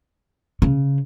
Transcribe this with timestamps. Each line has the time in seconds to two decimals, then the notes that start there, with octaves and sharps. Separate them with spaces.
0.62 C#3